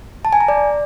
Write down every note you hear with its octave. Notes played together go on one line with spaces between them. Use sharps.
A5
G#5
A#5
D5